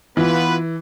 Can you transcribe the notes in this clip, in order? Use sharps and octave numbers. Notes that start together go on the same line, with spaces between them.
E3 B3 F4 B4